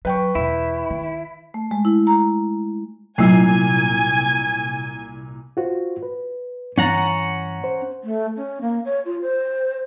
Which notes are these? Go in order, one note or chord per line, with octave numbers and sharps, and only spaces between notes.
F#3 B4 G5 C#6
E2 B2 E4
D#3
A3
G#3
E4
A#5
C2 A#2 F#3 A3 G#5 C7
F4 F#4 C5
B4
G2 E3 C#4 F#5 A#5 A6
C5
A3
C#4
A#3
C#5
F4
C5